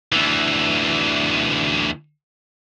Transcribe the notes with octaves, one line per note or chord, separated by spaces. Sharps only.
D2 E3